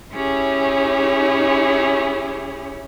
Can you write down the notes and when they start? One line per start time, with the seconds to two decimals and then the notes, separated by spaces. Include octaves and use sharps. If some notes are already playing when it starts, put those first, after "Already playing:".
0.13 C#4 E4 G4 G#4 C#5